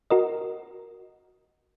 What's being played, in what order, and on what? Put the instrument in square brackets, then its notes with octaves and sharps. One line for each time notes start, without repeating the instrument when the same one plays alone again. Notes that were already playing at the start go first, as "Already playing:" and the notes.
[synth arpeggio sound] F#4 A#4 D#5